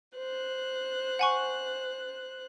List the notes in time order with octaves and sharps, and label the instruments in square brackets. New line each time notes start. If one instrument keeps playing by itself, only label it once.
[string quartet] C5 F#6
[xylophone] F#5 G#5 C#6